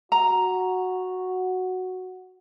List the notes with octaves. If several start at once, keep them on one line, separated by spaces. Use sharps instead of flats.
F#4 A#5